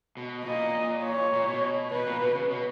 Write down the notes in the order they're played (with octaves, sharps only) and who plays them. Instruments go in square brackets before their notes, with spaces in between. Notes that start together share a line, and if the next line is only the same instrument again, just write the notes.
[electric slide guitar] B2
[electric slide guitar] A#2 [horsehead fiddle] D#5
[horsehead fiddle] C#5
[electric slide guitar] A#2
B2
[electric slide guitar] B2 [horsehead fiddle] B4
[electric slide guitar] A#2
B2
C#3
B2